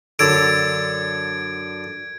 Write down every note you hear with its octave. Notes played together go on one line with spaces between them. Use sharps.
F#2 D3 A4 G#6 D7